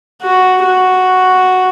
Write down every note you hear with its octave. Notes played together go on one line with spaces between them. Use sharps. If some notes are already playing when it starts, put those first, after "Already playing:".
F#4
F#4